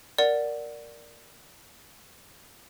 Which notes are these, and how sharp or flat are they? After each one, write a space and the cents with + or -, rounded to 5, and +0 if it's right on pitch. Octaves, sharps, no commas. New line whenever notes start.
A#4 +0 D5 +0 F#5 +0